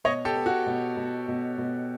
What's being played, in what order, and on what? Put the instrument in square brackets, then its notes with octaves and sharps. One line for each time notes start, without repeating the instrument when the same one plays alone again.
[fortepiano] B2 [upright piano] C#5 D#5
[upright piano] G4 A4
[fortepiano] B3
[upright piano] F#4
[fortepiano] B2
B2
B2
B2